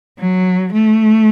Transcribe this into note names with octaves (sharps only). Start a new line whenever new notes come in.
F#3
A3